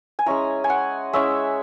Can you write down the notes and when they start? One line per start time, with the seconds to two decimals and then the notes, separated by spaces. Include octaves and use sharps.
0.19 G#5
0.26 G#3 C#4 E4 A#5
0.64 G#5
0.70 F#5
1.13 G#3 C#4 E4 E5